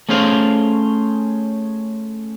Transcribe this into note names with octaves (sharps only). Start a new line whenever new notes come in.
A3 C#4 G#4 C5 F5